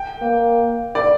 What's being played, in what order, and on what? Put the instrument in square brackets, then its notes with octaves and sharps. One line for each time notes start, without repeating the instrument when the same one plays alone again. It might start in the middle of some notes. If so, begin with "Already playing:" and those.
Already playing: [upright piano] G5
[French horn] A#3
[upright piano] D5